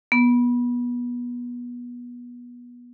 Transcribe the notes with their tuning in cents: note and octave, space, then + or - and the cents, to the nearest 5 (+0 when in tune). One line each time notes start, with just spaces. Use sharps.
B3 -25